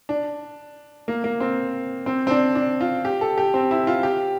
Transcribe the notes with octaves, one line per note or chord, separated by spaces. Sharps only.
D4
A#3
A#3
C4
C4
C4
D4
D4
F4
G4
A4
G4
C4
E4
F4
G4